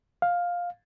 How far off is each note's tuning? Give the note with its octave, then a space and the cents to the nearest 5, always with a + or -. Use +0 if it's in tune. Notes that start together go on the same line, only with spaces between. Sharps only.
F5 +10